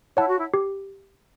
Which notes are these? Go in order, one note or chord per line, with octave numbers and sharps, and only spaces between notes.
E4 C#5 F#5 A5
F#4
E4
G4